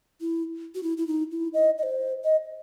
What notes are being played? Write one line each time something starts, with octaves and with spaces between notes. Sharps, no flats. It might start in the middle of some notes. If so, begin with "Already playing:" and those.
E4
F#4
E4
E4
D#4
E4
D#5
D#5
C5
D#5